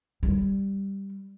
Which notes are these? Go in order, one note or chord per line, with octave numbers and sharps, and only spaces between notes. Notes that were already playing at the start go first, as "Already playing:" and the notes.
G3